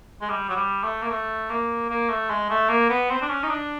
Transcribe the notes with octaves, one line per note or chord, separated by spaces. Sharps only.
G#3
G3
F#3
G3
A3
A#3
A3
A#3
A#3
A3
G#3
A3
A#3
B3
C4
D4
C#4
D#4
D4